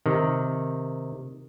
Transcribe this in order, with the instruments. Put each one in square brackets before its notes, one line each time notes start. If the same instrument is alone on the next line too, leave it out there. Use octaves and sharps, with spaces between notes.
[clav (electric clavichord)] C3 D#3